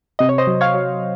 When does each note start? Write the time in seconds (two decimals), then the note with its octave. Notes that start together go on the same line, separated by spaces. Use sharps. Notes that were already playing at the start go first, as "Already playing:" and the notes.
0.19 C3 D#5
0.29 C#5
0.38 C5 D#5
0.47 F#3
0.61 C#5 F5
0.74 F#3